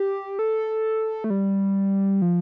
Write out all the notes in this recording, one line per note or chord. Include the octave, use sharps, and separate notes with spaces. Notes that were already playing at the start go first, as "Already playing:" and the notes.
Already playing: G4
A4
A3
G3
F3